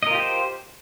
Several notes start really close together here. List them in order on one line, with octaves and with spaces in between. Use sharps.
D#5 A#4 F4 G4 C5